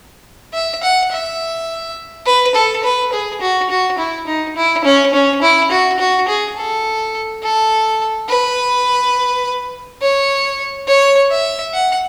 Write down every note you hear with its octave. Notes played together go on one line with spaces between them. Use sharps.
E5
F#5
E5
B4
A4
B4
G#4
F#4
F#4
E4
D#4
E4
C#4
C#4
E4
F#4
F#4
G#4
A4
A4
B4
C#5
C#5
E5
F#5